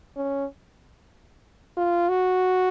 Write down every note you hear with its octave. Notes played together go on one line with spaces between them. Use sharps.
C#4
F4
F#4